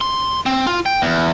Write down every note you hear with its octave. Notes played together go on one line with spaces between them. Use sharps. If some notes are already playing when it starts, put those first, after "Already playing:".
C6
C4
F4
G5
E2